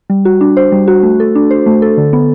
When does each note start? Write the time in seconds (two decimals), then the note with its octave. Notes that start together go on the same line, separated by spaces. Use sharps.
0.10 G3
0.25 F#4
0.41 D4
0.57 C5
0.72 G3
0.88 F#4
1.03 A3
1.20 A4
1.35 D4
1.51 C5
1.66 A3
1.82 A4
1.97 D3
2.13 B3